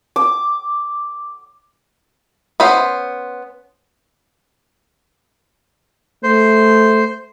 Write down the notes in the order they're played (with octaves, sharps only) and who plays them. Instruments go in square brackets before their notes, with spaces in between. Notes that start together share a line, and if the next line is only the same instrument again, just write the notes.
[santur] D6
[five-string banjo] B3 C#4 C5 B5
[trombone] A3 [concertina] C5